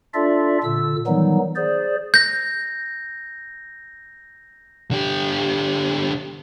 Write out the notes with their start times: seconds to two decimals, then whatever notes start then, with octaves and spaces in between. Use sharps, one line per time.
0.14 D4 F4 A4 D5 E5
0.64 A#2 D3 E6
1.07 D#3 E3 F#3 G3 B3 D#4
1.56 G#4 C5 D5
2.14 G6 A#6
4.91 D3 G4